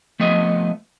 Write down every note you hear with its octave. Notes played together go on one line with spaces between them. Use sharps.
F3 A3 B3 D#5 E5